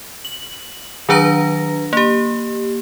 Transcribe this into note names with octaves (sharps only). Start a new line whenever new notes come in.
F#7
D#3 F#3 D4 B4 A#5 A#6
A#3 G4